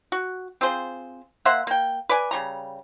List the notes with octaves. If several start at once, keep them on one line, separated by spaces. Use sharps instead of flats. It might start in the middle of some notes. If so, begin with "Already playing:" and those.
F#4
C4 F4 G#4 C5
A#3 C5 E5 F#5
A#3 G5
B4 D5 G#5
C#3 G3 A#5